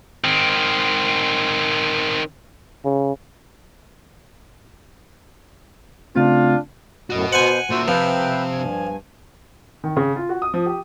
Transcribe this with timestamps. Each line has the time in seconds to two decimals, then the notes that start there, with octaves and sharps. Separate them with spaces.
0.24 D#3 C4
2.85 C#3
6.16 C#3 A3 C4 D4 F4
7.10 F#2 A2 F#4 D#5
7.33 B2 C5 F#5 G#5
7.70 A#2 F#4 C5 E5
7.88 C3 F3 C4 B4 E5 G5
8.52 G2 G#5
9.84 D#3
9.97 C#3
10.16 F4
10.29 F#4
10.42 D#6
10.54 F3
10.66 G4